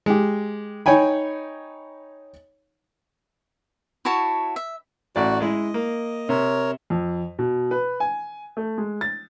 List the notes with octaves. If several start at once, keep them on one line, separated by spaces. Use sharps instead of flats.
G#3 G4
D#4 C#5 G5 G#5 B5
E4 F#4 C#5 A5
E5
A1 F#4 D5
G#3 E4 D#5
A#3
C3 A#4 C#5
F2
B2
B4
G#5
A3
G#3
A6